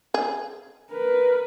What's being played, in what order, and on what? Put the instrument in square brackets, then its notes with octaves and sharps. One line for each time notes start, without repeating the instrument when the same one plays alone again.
[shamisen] G#4
[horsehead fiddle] A#4 B4